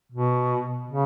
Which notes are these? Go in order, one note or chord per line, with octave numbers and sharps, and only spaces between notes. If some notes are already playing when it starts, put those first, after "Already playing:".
B2
C#3